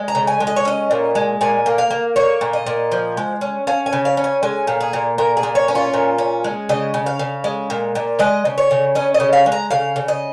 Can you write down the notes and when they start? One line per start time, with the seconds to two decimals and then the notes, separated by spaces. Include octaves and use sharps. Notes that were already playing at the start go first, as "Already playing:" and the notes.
Already playing: G#3
0.08 A#5
0.15 C#3
0.27 G#5
0.40 G#3
0.47 D#5
0.56 C#5
0.65 C#4 D#5
0.91 A#2
1.15 G#3
1.41 A#2 G#5
1.66 A#3
1.78 F5
1.90 A#3
2.16 A#3 C#5
2.41 A#2
2.53 D#5
2.66 A#2
2.92 F3
3.17 G#3
3.41 C#4
3.67 C#4 F5
3.86 G#5
3.93 C#3
4.05 F5
4.17 C#4
4.24 G#5
4.43 G#3 G#5
4.67 A#2
4.80 G#4
4.93 A#2
5.18 A#2 A#4
5.37 G#4
5.43 A#2
5.55 C#5
5.68 C#4
5.75 F4
5.94 A#2
6.18 C#4
6.44 G#3
6.69 C#3 D#5
6.94 C#3
7.06 F5
7.19 C#3
7.44 G#3
7.70 A#2
7.95 A#2
8.19 G#3 D#5
8.45 C#3
8.58 C#5
8.71 C#3
8.95 C#4 D#5
9.14 D#5
9.20 C#3
9.33 F5
9.46 G#3
9.52 A#5
9.71 C#3 F5
9.96 C#3
10.08 D#5